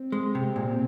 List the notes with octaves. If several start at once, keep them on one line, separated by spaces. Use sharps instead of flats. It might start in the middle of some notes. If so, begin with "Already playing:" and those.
Already playing: C4
G#3
C3
A#2